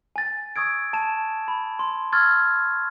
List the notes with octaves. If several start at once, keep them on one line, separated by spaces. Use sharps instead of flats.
G#5 A6
C#6 D#6 E6 G#6 D7
A5 E7
B5
C6
C6 C#6 E6 F6 G#6 A6